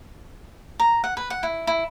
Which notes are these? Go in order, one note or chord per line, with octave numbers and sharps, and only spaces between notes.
A#5
F#5
B4
F#5
E4
E4